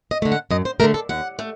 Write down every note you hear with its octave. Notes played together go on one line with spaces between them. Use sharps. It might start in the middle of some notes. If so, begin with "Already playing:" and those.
D#5
D3 A3
F#5
F#2 D#5
C5
D3 A3 A#4
A4
D#2 F#5
A3